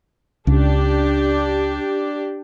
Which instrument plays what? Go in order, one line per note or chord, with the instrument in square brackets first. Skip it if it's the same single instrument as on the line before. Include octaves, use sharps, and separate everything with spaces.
[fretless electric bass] C#2 [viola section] D4 G4